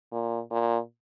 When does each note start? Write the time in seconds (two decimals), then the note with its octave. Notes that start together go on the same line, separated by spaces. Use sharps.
0.12 A#2
0.51 A#2